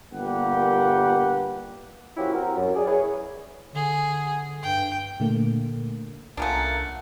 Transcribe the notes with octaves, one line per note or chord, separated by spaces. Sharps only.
G1 A#2 A#3 G4 B4 F#5
F3 A#3 C#4 E4 F#4 G4
C4 F#4 G4 A#4
F#2
G#4 D5
E4 G#4 B4 C#5
D3 G#4
G2 G5
A#2 D3 A3 A#3
C2 A3 A#3 C#4 D4 F4 F#5